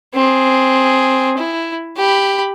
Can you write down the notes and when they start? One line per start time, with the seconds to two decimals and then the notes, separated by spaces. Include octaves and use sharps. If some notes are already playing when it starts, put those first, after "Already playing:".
0.14 C4 G#4
1.38 E4
1.97 G4 B5